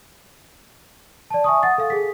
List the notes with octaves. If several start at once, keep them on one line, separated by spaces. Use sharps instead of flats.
D5 A5
E5 G#5 C#6 D#6
F#5 D#6 A6
A4 F5
G#4 B6